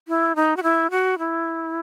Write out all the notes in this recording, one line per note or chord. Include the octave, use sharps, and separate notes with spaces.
E4
D#4
F#4
E4
F#4
E4